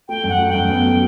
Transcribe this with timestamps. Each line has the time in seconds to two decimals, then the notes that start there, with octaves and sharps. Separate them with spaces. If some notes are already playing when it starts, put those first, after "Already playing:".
0.09 A3 G5
0.24 F#2
0.29 F#5
0.39 A3
0.49 G5
0.54 F#2
0.70 B3
0.85 F#3